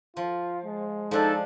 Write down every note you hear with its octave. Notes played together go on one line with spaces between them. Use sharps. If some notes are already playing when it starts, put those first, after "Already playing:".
F3 F4
G#3
F3 D4 D#4 A4